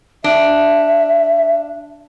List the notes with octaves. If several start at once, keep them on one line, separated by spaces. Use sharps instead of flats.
D4 E5